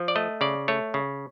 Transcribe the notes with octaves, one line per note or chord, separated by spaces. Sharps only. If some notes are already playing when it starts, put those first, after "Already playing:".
Already playing: F3
D5
A3 D#5
C#3 D5
A3 C#5
C#3